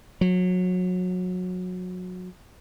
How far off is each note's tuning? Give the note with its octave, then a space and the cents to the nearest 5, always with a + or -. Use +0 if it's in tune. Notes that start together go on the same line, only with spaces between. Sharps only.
F#3 -25